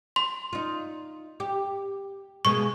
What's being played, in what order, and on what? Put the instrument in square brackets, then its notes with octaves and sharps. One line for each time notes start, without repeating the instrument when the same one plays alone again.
[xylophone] C6
[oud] D#4 F4
G4
[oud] B2 G#3 A#3 [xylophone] C#6